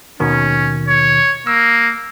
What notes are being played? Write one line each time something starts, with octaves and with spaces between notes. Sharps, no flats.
D#2 B2 D#3 C#4
C#5
A#3 E6